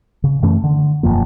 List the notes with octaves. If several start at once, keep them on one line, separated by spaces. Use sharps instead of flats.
C#3
F#2 E3 A3 C#4
D3
E1 F#2 F3 A#3